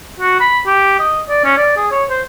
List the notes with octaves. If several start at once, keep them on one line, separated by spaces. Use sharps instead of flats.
F#4
B5
G4
D#5
D5
C#4
D5
G#4
C#5
C5